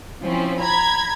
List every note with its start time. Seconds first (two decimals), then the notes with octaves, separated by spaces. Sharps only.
0.23 F3 C4 C#4 E4
0.59 A#5 B5 G#6